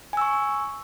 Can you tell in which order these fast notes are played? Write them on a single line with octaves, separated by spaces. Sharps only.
G#5 E6 C#6